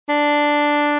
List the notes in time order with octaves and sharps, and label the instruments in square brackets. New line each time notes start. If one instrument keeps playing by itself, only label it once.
[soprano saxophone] D4